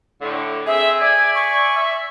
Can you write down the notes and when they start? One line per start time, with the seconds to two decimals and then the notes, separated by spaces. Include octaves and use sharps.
0.21 A2 D3
0.67 C4 G#4 E5
1.00 D5 E5 G#5 G#6
1.35 C#6
1.76 E5